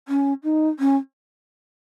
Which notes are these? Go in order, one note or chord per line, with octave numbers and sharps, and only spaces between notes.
C#4
D#4
C#4